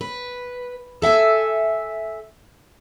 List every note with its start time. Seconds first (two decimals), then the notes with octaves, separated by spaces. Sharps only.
0.01 B4
1.02 A4 E5 F#5 G#5